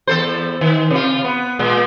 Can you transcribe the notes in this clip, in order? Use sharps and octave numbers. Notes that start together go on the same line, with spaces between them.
E2 A4 C5
D#3
C3 F4
B3
A#2 G#3